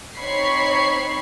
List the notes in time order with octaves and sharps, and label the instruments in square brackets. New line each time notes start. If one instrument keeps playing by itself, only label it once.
[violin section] C4 D#4 C#5 B5 C#6 C7